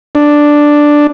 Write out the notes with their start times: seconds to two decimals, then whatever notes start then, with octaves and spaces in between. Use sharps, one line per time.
0.15 D4